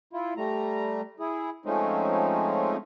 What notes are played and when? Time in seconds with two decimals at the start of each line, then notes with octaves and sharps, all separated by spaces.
0.13 E4 F4
0.37 G3 A3 A#5
1.20 E4 G#4
1.66 F3 G#3 A3 C4 C#4 D#4